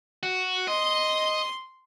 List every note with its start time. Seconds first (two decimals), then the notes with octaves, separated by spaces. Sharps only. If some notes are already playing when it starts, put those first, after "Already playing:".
0.23 F#4
0.68 D#5 C6